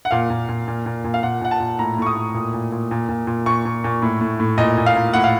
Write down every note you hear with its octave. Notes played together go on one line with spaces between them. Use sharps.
F#5
A#2 F5
A#2
A#2
A#2
A#2
A#2
F5
A#2 F#5
A#2 F#5
A5
A#2
A2 A#5
A2 C#6
D#6
A2
A#2
A#2
A#2
A#2
A#2
A#2
A#2 C#6
A#2
A#2
A2
A2
A2
A#2 D#5
A#2
F5
A#2
A2 F#5
F5